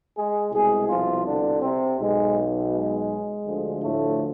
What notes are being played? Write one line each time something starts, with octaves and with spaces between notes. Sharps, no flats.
G#3 G#4
C2 B2 G#3 G#4
F3 F4
D3 D4
C3 C4
B1 B2 G#3
G#3
D2 D3 F3
A2 A3